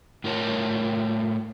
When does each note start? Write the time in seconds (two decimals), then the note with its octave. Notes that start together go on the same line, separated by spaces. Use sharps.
0.24 A2 F4 A#4 C#5 A5